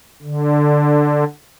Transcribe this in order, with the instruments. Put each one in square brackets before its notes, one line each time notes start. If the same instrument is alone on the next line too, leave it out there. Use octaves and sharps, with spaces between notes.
[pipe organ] D3